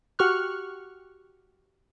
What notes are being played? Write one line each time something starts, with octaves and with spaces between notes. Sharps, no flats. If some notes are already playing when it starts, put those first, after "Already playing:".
F#4 G4 C#6 F6 F#6